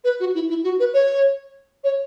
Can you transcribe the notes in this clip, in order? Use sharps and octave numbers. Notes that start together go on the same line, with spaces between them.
B4
F#4
E4
E4
F#4
B4
C#5
C#5